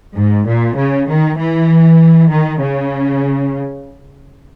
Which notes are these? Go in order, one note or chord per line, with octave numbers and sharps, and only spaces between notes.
G#2
A#2
C#3
D#3
E3
D#3
C#3